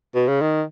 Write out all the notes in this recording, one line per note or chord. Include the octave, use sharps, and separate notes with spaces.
B2
C#3
D#3